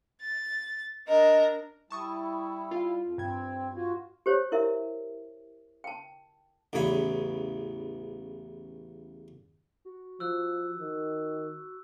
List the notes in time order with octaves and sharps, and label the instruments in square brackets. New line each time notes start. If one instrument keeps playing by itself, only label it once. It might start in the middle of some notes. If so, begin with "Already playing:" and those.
[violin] A6
[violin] D4 A#4 [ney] D#5
[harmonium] G3 E4 [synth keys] A5 C#6 D#6
[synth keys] F4 F5
[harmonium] F2
[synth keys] G2 G#6 [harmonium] C4
[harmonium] F4 F#4
[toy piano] G4 C5 C#5
E4 A#4 E5
G5 A5
[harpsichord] A1 E2 C#3 C#5 B5
[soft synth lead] F#4
[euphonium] F3 [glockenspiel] E6 F#6
[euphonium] D#3